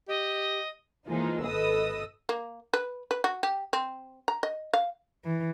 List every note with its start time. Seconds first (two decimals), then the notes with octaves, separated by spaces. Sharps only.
0.08 G4 D#5
1.07 E3 F3 G#3 A#3 D#4 F4
1.45 G#1 A4 B4 D#5 D#6 E6
2.29 A#3
2.74 B4
3.11 B4
3.24 F#4
3.43 G4
3.73 C4
4.28 A#5
4.43 D#5
4.74 F5
5.25 E3